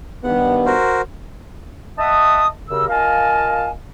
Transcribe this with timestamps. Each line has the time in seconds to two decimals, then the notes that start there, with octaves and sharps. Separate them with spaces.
0.24 G2 D#3 B3 F#5
0.66 F#4 A#4 C5
1.98 D#5 E5 F#5 A5 D#6
2.69 F#2 C#3 G4 A#4 E6
2.89 F4 A#4 D#5 F5 G#5 A5